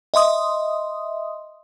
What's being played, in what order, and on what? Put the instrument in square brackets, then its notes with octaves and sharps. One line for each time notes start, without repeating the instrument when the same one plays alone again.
[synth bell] D#5 E5 C6 D#6